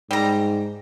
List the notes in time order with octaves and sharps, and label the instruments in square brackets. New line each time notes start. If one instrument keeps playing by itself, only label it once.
[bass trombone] G#2 [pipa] G3 A#5